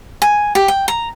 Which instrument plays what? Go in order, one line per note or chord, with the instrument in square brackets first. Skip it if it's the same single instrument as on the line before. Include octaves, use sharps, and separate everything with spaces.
[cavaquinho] G#5
G4
G5
A#5